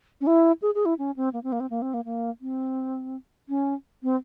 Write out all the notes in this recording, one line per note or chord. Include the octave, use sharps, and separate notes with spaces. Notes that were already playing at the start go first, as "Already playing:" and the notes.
C#4
E4
G#4
G#4
E4
C#4
C4
A#3
C4
A#3
C4
A#3
C4
A#3
A#3
C4
C#4
C4